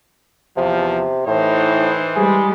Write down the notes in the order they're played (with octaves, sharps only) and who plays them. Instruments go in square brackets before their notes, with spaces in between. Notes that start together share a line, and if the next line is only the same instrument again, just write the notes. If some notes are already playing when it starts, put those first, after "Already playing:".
[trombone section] E2 F3 [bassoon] C3
[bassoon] A2 [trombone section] E3 C5 [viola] D#4
[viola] G3 G#3 [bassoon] G#4